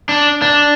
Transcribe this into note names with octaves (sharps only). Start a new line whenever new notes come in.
D4
D4